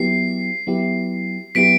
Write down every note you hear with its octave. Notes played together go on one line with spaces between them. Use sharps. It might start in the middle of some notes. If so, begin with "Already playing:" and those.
Already playing: F#3 B3 E4 G4 C7
F#3 B3 E4 G4
F#3 B3 E4 G4 B6 D7